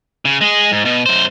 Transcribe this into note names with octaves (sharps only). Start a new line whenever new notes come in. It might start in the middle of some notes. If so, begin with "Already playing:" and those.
C#3
G#3 G#4
G#2
B2
F#2 C5